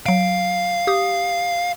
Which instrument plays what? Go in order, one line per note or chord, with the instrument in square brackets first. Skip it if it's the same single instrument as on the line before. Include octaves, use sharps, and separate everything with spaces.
[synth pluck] F#3 D7 [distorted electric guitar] F5
[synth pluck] G4 D#6